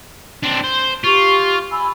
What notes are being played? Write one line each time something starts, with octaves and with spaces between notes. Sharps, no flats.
C4 D4
C5
F4 G4 C#6
G#5 B5 E6